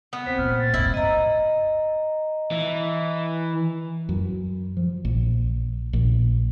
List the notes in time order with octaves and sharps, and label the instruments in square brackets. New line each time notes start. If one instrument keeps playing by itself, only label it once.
[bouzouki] B3
[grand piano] C4 [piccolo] B6
[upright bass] A#2 [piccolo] F6
[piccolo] A6
[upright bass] G2 A#2 [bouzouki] E4
[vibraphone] D#5 A#5
[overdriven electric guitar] E3
[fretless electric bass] F#2
F3
A#1
A#1